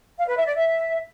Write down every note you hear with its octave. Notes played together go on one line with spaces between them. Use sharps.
F5
B4
E5
D5
E5